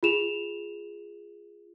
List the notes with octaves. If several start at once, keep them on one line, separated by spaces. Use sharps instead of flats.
F4 G#4 E7 F7